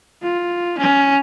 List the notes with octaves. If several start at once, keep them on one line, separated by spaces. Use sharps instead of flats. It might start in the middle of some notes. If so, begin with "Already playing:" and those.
F4
C#4